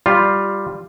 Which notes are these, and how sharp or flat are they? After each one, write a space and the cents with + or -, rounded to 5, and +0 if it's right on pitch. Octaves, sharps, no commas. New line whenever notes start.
G3 +0 F4 +0